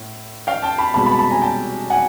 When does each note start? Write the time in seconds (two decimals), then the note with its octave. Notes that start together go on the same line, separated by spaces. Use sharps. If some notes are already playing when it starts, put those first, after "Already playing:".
Already playing: A2
0.47 F5 G5
0.62 G5 A5
0.78 A5 B5
0.94 C2 B2 G#3 A5 B5
1.06 A5 B5
1.19 A5 B5
1.31 G#5 A#5
1.42 G5 A5
1.90 F#5 G#5